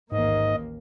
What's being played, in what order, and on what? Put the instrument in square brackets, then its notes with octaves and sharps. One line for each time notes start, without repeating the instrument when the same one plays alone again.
[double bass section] A1 D#2 A#3 [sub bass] G#2 [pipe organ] D#5